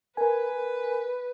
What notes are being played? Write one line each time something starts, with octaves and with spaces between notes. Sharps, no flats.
A#4 B4 G#5